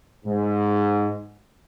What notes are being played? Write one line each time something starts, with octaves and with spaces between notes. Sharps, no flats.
G#2